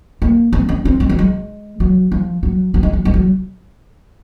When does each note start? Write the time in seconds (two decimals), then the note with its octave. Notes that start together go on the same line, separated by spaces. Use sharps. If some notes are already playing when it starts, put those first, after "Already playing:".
0.22 A#3
0.53 C4
0.69 C#4
0.85 C4
1.00 G#3
1.09 F#3
1.19 G#3
1.80 F#3
2.12 F3
2.43 F#3
2.74 F#3
2.83 G#3
2.93 F#3
3.05 G#3
3.14 F#3